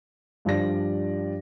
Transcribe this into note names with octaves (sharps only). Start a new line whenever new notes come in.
G2 F3 D4 G4 D5 A#6